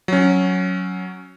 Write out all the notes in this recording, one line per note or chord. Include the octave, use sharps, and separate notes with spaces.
F#3 C#4